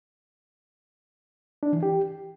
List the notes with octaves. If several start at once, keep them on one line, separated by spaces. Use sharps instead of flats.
D4
E3
G4